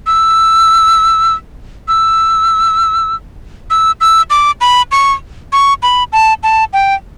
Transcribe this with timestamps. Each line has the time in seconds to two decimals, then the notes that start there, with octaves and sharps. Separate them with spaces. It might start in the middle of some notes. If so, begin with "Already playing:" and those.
0.07 E6
1.88 E6
3.70 E6
4.01 E6
4.30 D6
4.61 B5
4.92 C#6
5.53 C#6
5.83 B5
6.12 A5
6.43 A5
6.73 G5